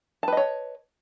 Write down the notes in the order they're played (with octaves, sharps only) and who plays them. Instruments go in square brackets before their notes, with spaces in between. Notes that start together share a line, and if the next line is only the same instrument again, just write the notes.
[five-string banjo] A5
B4
D#5
C#5